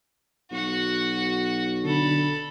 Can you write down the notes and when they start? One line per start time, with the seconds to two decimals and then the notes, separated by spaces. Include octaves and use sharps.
0.51 B1 F#4 F#5
1.85 D3 A4 B5